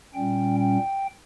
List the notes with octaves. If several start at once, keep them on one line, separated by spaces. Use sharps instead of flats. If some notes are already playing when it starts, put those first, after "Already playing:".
A#2 G3 C#4 G5
G5